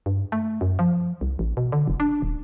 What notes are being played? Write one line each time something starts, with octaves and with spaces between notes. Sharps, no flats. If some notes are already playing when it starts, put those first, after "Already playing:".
G2
A3
F#2
F3
C2
A1
B2
D3
F1
D4
D#1